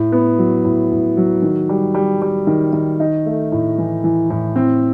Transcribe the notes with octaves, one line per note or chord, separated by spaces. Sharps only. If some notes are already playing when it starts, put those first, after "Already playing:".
Already playing: A2
B3
F#3
A2
A2
F#3
D#3
G3
G3
G3
D#3
D#3
D#4
A3
A2
E3
E3
A2
C4